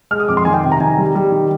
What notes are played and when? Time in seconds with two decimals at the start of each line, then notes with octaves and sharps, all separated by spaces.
0.11 G#3 F6
0.19 D#6
0.28 F2 D6
0.37 C6
0.45 D#3 G#5
0.54 G5
0.63 C3
0.72 A#5
0.80 D#3 G#5
0.98 G3
1.15 G3
1.32 D#3